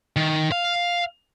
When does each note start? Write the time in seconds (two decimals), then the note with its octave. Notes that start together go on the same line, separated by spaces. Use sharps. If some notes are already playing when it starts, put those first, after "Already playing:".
0.16 D#3
0.52 F5